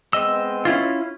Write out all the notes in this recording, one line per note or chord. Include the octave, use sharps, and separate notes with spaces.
G#3 B3 C4 D#5 E6
C#4 E4 F4